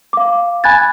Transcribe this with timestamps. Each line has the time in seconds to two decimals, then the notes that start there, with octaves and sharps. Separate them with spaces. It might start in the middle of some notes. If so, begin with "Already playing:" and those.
0.13 F5 D6
0.64 G#5 B5 F#6 G#6 A6